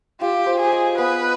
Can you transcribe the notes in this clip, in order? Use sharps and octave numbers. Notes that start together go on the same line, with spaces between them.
F4 G4
C5
G#4
D#5
B3 B4